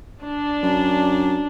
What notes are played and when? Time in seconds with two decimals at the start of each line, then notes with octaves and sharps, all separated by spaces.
0.23 D4
0.63 F#2